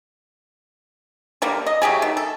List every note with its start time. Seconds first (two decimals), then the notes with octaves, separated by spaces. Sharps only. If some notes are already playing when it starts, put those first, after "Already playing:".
1.42 D3 G3 A#3
1.66 D#5
1.82 F#3 A3 G4 G#4
2.02 D#3
2.17 A4